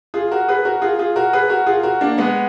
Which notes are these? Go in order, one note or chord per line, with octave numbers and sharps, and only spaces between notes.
F4 G#4
F#4 A#4
G#4 B4
F#4 A#4
F4 G#4
F4 G#4
F#4 A#4
G#4 B4
F#4 A#4
F4 G#4
F#4 A#4
A#3 D4
G#3 B3